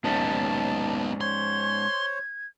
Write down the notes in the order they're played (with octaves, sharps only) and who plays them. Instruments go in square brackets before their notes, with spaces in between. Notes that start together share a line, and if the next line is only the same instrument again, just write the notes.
[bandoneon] D#2 [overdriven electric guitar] G#2 C#4 [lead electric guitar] B3 D#4 [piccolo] A5
[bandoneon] C5 C#5 [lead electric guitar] C6 [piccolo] G#6